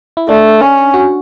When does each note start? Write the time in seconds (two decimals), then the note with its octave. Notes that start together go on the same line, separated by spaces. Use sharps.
0.17 E4
0.29 A3 D4
0.61 C#4
0.94 F#4